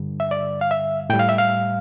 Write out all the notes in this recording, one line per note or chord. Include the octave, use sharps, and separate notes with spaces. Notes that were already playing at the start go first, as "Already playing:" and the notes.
Already playing: G2 D3 G3
E5
D5
F5
E5
A2 G3 G5
F5
E5
F5